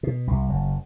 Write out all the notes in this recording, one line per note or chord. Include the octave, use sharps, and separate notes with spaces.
B2
C2
F#1